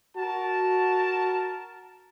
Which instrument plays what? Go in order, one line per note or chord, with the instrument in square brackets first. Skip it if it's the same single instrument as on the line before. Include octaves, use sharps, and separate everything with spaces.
[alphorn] F#4 [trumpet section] A#4 A5